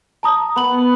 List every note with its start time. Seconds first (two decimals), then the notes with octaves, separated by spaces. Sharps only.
0.23 A5 A#5 D#6
0.56 B3 B5 F#7